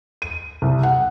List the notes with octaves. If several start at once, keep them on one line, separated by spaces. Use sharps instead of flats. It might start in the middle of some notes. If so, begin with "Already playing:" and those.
D#7
C2
F#5